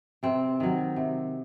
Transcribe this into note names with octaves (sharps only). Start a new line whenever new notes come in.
C3 C4
D#3 F#3
C3